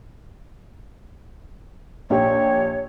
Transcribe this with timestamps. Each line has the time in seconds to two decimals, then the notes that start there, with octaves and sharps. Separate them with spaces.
2.10 A#1 G4 C#5